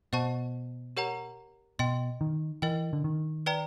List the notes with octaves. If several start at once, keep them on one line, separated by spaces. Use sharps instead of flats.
B2 C5 D#5 F#5 A5 C#6
G4 A#4 C#5 F#5 A#5
B2 D#5 G5 C6
D#3
E3 A#4 D#5 G5
D3
D#3
B4 D5 G5 A#5